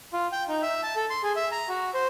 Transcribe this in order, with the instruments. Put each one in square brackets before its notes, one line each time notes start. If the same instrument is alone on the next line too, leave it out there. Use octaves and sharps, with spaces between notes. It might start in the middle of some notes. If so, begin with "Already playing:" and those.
[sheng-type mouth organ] F4
G5
D#4
E5
A5
A4
C6
G#4
E5
A#5
F#4
C5